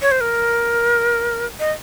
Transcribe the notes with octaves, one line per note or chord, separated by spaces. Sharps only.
C#5
C5
A#4
D#5